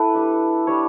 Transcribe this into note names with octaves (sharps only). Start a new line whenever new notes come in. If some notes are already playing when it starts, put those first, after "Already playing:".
Already playing: E4 A4 B4
G3 D4
G3 D4 C#5